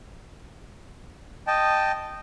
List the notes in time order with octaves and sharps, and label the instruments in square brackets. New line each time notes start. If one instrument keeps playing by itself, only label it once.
[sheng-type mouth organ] D#5 G5 A5